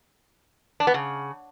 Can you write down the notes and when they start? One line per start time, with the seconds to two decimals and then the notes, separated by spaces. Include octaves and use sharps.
0.80 D4
0.87 B3
0.94 C#3